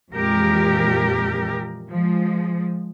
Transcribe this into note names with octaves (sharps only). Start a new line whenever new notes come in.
F2 A#2 E3 G#3 G4 A#4
F3 G#3